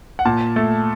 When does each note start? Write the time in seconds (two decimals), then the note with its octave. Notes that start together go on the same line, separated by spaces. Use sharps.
0.19 F#5
0.25 A#2 A5
0.56 A3